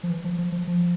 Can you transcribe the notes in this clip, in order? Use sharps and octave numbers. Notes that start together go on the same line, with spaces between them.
F3
E3
F3
F3
F3
F3